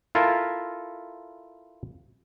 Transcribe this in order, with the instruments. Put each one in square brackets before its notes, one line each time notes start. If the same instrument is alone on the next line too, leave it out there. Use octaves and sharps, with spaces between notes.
[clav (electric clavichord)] E4 F4 A4 A#4 E5